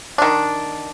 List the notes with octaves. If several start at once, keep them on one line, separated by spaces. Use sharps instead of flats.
D#3 D4